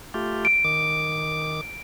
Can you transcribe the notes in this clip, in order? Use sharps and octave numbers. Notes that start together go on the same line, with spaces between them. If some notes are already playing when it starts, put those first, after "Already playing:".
A3 F4 G4
D7
D#3 D6